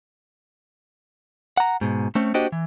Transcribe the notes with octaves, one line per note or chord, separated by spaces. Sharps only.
F#5 A#5
G#2 B2
A3 C4 C#4
A#3 D4 F#4 G4 C5 D#5
E3